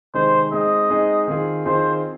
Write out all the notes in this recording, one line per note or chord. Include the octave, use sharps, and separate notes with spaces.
C3 D#3 G#3 D#4 G#4 C5
G#3 C4 D#4 G#4 D#5
G#3 C4 D#4 G#4
D#3 C4 F4 G#4
D#3 C4 F4 G#4 C5